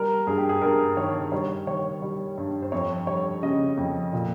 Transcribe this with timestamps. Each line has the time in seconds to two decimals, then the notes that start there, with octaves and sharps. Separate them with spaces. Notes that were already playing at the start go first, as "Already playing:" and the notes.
Already playing: G3 A#4
0.27 G2 G#4
0.38 G4
0.49 G#4
0.62 G2 A#4
0.97 D#3 C#5
1.32 G3 C#5
1.67 D#3 C#5
2.02 G3
2.37 G2
2.62 C5
2.72 F2 C#5
3.07 G3 C#5
3.43 C#3 D#5
3.77 F2
4.13 A#2